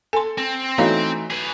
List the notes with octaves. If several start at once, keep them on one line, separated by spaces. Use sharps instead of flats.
A4 G#5 C6
C4
E3 A3 D#4 F#4 C#5 F5
G#4 B4